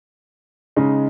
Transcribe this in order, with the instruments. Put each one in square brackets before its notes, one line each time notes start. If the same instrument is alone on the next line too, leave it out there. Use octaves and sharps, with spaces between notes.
[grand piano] C#3 G#3 D#4